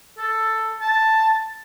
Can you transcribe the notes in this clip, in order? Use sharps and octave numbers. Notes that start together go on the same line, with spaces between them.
A4
A5